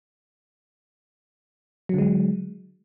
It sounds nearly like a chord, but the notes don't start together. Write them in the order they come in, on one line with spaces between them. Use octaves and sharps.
F#3 D3 G#3